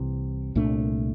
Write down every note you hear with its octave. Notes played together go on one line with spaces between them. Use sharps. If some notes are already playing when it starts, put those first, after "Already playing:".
Already playing: C2 C3 E3
C2 A#2 A3 D4